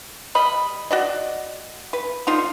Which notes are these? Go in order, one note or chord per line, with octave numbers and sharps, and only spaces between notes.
G3 D#5 B5
F#4 D5 D#5
B4
D3 D#4 F4